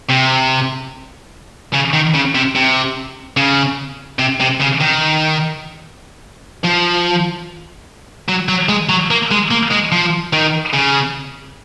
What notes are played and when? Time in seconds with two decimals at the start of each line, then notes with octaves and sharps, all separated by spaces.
0.09 C3
1.74 C#3
1.93 D#3
2.14 C#3
2.35 C3
2.55 C3
3.37 C#3
4.19 C3
4.40 C3
4.60 C#3
4.80 D#3
6.64 F3
8.28 F#3
8.48 F#3
8.69 G#3
8.89 F#3
9.10 A#3
9.31 G#3
9.51 A#3
9.71 G#3
9.92 F3
10.33 D#3
10.73 C#3